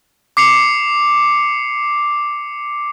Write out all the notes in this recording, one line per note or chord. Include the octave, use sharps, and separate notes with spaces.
D6 C7 C#7 F7